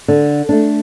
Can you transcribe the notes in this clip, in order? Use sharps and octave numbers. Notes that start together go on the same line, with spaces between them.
D3
A3 D4